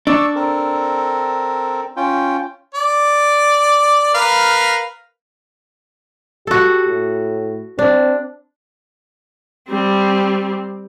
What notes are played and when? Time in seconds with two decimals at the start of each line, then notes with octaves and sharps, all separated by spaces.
0.07 D4 D5 C#6 E6
0.35 C4 A4 A#4
1.97 C#4 F4 G5
2.75 D5
4.14 A#4 B4 F5
6.47 F#4 G4 A4
6.87 A2
7.79 C4 D4
9.69 G3 C4